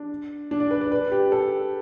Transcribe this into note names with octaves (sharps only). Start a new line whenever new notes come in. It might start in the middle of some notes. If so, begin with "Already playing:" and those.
Already playing: D4
D4
D5
B4
D5
B4
G4
A4